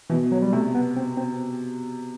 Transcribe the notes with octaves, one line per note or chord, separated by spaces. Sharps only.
B2 E3
F#3
G3
C3 A3
B3
C4
C4